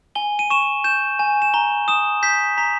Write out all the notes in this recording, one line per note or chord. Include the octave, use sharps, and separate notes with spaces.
G#5 G7
D#7
C#6 E7
G6 E7
G#5
E7
A#5 G7
D#6 E7
G6 B6
A#5 B6